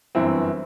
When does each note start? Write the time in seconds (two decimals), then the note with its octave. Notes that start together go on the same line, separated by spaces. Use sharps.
0.15 G1 F#2 E3 C4 E4